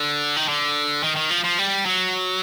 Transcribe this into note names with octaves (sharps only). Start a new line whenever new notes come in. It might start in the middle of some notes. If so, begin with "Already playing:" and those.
Already playing: D3
D#3
D3
D#3
D#3
F3
F3
G3
F#3